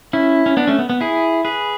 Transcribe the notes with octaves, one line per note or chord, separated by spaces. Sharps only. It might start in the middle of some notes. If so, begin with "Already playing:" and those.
C#4 E4
C#4
B3 D4
A3 C#4
B3
B3
E4 G#4
G#4 B4